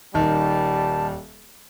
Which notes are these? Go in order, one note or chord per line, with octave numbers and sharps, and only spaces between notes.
D#1 D#3 G3 A5